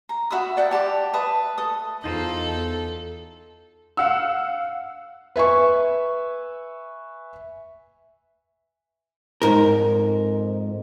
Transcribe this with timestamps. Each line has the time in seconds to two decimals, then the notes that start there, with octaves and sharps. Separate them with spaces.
0.09 A#5
0.30 F#4 E5 B5 D#6
0.57 D5 F#5 G5 A5
0.71 G4 A5 C6 D6
1.13 B4 E5 A5 D#6
1.58 A4 D#6
2.04 E2 D#4 F4 A4 C5
3.97 F5 F#5 E6
5.36 B4 E5 G#5 C#6
9.42 F2 G#2 A#4